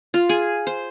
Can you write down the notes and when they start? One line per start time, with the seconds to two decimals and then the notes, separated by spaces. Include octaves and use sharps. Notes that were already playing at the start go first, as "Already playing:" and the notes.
0.14 F4
0.29 G#4
0.67 C5